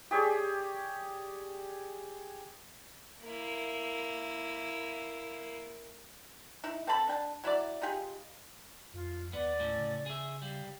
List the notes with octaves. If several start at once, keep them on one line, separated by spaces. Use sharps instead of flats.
G4 G#4 C#5 D5
A#3 E4
D#4 E4
C4 A4 A5 B5
D4 G5 A5
F#3 E4 A#4 D5
D#4 F4 G4 G#4
F2 F4
D#2 B3 D5
A2 C#4
C#3
G#4 E5
G3 F5